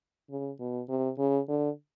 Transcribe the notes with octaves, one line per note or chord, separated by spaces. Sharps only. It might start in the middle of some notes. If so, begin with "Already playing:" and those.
C#3
B2
C3
C#3
D3